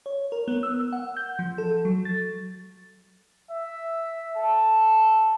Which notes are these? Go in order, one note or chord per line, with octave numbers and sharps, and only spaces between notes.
C#5
A#4
B3
E6
F#5
G6
F3
A4
F#3
A6
E5
A4